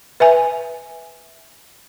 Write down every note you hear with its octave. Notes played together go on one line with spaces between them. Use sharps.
B4 E5 G#5